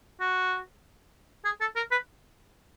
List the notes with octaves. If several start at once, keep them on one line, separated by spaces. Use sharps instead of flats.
F#4
G#4
A4
A#4
B4